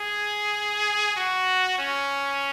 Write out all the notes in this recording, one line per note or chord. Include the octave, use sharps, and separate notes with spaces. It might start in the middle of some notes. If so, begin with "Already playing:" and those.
Already playing: G#4
F#4
C#4